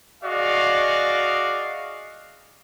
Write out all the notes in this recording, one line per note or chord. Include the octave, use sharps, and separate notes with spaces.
F#4 G#4 D5 D#5 F5